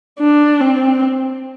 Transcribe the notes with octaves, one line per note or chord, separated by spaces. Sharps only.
D4
C4